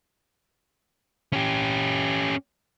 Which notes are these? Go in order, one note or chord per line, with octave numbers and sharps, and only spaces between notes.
C#4 G4